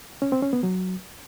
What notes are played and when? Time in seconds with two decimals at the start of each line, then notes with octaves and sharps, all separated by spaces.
0.22 C#4
0.32 C4
0.43 C#4
0.53 B3
0.63 F#3